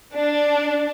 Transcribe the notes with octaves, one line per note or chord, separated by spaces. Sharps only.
D4